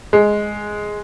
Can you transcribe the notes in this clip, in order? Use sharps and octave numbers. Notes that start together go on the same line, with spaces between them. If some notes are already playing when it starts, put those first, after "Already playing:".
G#3